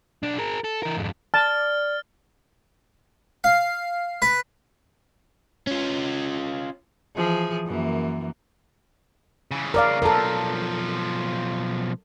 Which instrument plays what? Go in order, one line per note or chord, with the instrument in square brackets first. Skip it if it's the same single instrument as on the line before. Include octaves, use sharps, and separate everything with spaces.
[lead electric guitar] B1 D4
G#4 A#4
A4
E3 A#4
F2 G#2
[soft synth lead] D5 [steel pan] A5 [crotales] F6 A6
[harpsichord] F5
B4
[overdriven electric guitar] C#4 F4
[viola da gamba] E3 F3 G#4
F#2 E3 A#3
[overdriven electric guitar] C#3 E3
[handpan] A#4 D5 F5
[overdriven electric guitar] B1 F3 [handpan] A4 A#4